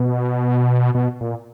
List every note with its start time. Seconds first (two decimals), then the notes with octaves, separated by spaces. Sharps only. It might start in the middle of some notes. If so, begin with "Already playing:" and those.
Already playing: B2
0.95 B2
1.21 A#2